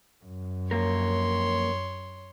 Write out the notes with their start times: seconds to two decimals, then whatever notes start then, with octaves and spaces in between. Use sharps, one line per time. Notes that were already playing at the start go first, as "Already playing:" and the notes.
0.25 F#2
0.71 F2 A#3 A#4 C#5 C6